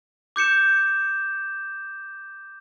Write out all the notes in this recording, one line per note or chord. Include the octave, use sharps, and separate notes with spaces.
D6 G6 C#7 E7